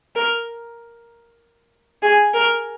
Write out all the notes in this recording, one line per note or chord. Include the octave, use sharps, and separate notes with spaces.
A#4
G#4
A#4